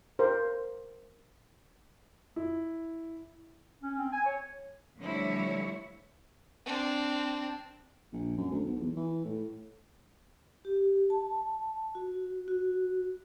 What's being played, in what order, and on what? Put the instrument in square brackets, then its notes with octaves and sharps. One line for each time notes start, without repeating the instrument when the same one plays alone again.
[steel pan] A#4 C5
[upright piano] E4
[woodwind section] C#4
C4
G#5
C#5
[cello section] D3 F3 G3 A3 E4 C#5
[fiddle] C4 D4
[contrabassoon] A#1
F#2
D2
B1
E2
E3
A2
[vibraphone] G4
A5
F#4
F#4